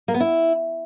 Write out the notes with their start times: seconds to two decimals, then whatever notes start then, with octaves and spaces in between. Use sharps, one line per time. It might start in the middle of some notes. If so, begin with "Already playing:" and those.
0.08 A#3
0.14 B3
0.20 E4